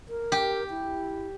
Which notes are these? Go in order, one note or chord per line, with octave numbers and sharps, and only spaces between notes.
A#4
G4
E4